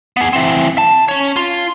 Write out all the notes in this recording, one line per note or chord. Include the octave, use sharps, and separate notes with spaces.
B3 G#4
E3 C4
A5
C#4 C#5
F4